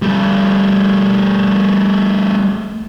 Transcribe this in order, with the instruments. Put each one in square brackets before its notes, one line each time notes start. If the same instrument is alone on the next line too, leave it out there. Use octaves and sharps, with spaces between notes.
[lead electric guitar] G3 A3